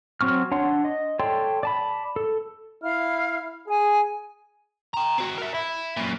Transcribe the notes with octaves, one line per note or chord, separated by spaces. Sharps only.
F#3 C4 C#6 F6
D4 C#5 F#5 C6
D#5
A4 C#5 D5 G5 C6
D5 A5 B5
A4
E4 F5 F6
G#4 G#5
G5 A#5
C4 F#4
A#4 E5
E4
F#2 A#2